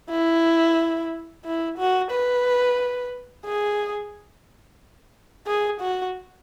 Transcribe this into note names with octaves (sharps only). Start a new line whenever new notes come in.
E4
E4
F#4
B4
G#4
G#4
F#4